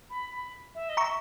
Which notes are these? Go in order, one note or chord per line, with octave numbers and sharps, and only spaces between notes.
B5
B5
E5
D#5
E5 A#5 C#6